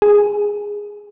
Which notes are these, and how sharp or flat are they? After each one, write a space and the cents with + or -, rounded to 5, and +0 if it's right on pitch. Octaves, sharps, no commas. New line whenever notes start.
G#4 -10